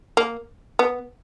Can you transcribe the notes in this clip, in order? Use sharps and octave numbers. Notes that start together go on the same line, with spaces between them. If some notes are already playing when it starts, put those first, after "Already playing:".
A#3
B3